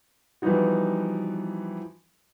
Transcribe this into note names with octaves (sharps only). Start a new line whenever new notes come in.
E3 F3 G3 B3 D#4 F#4